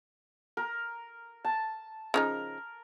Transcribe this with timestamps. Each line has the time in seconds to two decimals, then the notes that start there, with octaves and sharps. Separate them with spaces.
0.57 A#4
1.44 A5
2.14 C#3 F3 D#4 A#4